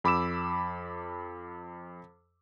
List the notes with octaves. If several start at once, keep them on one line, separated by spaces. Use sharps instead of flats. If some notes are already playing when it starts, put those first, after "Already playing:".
F2 B5 D6 E6 E7